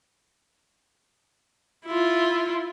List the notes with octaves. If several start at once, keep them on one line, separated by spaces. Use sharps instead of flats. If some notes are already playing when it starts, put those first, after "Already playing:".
E4 F4